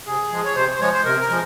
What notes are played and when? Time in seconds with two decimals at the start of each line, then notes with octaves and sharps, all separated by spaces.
0.06 C3 G#4
0.31 F3 G#3
0.45 C#5
0.56 C3 C5
0.75 C5
0.80 F3 G#3 C#5
0.93 C5
1.05 C3 A#4
1.21 A#4
1.30 F3 G#3